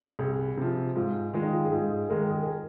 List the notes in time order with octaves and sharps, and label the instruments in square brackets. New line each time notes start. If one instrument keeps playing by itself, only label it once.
[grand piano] C2 [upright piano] G#4
[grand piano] C3 F3
[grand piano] G#2 [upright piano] F4
[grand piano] D#3 G#3 [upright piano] F4
[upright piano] D#4
F4
G#4
[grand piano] G#2 [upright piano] F4
[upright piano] G#4
[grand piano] D#3 G#3 [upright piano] A#4
[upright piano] G#4
A#4